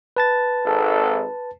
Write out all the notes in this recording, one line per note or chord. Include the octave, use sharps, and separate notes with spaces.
B4 A5 A6
G#1 A4